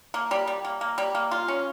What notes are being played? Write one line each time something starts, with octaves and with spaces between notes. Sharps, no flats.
A#3
G3
G3
A#3
A#3
G3
A#3
F4
C#4